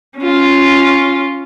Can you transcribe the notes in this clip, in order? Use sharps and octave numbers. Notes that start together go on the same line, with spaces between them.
C#4 F4